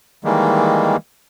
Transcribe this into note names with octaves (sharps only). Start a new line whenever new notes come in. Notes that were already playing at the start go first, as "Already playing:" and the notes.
D#3 E3 G3 G#3 A#3